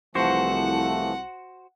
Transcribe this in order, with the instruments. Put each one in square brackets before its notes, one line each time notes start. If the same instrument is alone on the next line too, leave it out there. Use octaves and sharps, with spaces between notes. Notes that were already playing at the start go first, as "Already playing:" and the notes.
[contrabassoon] C2 [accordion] E3 F3 A3 [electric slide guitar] F#4 C5 [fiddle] F#5